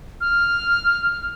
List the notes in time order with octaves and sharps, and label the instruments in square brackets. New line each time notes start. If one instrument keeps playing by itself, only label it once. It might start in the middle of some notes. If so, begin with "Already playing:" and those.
[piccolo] F6